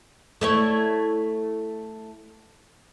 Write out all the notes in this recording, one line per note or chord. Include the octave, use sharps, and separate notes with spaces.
A3 E4 C#5